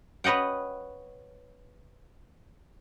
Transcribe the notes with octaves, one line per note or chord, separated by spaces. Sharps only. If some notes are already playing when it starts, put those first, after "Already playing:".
B4 C#5 D#5 F#5 G5